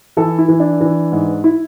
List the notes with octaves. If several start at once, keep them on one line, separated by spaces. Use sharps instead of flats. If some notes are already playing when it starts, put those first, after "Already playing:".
E3 A4
E4
E3
D4
E3
G#2
E4